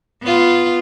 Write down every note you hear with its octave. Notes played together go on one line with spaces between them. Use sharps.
B3 F4